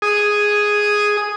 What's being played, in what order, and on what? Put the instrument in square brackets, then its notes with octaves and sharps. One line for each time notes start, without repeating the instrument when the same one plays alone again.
[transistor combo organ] G#4 D#6